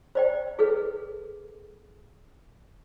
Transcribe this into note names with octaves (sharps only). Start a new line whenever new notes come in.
C5 D5 G5
G#4 A4 B4